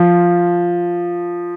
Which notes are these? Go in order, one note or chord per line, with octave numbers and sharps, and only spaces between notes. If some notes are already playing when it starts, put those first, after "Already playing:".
Already playing: F3